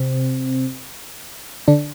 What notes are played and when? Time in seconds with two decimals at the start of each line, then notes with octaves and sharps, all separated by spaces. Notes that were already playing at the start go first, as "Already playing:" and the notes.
Already playing: C3 C4
1.68 D3 D4